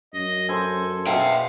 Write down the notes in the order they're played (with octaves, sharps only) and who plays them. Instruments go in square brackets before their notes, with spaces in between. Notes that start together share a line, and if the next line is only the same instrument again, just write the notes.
[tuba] F#2 [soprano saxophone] D#5
[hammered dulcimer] A4 C5 [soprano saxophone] G#5
[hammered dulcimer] B2 G#5 [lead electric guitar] E5 G5 [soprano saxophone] F5